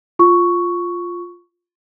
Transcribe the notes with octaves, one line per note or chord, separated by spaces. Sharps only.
F4 C#6